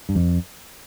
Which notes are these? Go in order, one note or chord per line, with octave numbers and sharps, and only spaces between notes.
G2
F2